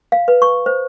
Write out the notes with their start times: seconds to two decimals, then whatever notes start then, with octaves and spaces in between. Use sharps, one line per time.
0.12 F5
0.28 B4
0.42 C#6
0.66 C5